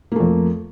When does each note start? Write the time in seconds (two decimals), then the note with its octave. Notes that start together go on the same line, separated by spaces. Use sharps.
0.12 A#3
0.16 A3
0.20 F2